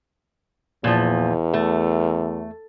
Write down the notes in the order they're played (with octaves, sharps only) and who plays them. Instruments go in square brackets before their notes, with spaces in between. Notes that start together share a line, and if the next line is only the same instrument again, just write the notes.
[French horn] E2 [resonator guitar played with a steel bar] A#2 F3
[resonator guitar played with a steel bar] A3